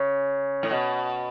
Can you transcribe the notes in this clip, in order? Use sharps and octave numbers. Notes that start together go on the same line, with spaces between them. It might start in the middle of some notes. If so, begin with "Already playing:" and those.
Already playing: C#3
A2
B2